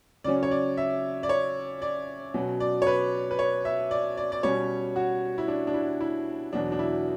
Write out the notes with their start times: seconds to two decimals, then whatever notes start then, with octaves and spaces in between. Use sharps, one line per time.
0.24 C#3 F#3 C#4 D5
0.43 C#5
0.51 D5
0.77 E5
1.23 D5
1.29 C#5
1.82 D5
2.34 B2 F#3 C#4
2.60 D5
2.82 C#5
2.87 B4
3.31 B4
3.39 C#5
3.65 E5
3.91 D5
4.17 D5
4.32 D5
4.43 B2 G3 C#4 C#5
4.96 F#4
5.38 E4
5.48 D4
5.67 D4
5.74 E4
6.01 E4
6.53 E2 B2 F#3 D4
6.72 D4
6.79 E4